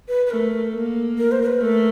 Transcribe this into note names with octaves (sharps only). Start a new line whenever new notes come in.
B4
B4
A3 A#4
A#3
A#4
C5
A#4
B4
A3 A#4